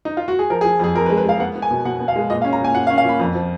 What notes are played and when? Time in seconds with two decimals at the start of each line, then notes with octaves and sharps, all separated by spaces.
0.05 D#4
0.17 F4
0.28 F#4
0.39 G#4
0.50 F3 A#4
0.61 G#4
0.65 F3
0.80 F2 G#4
0.95 F2 A#4
1.06 B4
1.10 G#3
1.17 B4
1.26 G#3 F5
1.40 B3 F#5
1.55 B3
1.62 G#5
1.71 B2
1.85 B2 F#5
2.00 B3
2.08 F5
2.16 G#3
2.30 A#2 D#5
2.42 F5
2.45 C#4
2.53 A#5
2.60 A#2 G#5
2.75 A#2 F#5
2.87 F5
2.90 C#4
2.98 F5
3.05 A#2 B5
3.20 F2
3.35 F3